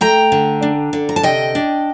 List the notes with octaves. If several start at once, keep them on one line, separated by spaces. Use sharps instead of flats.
A3 G5 A#5
D3
D4
D3
A#5
A5
C3 D#5 G5
D4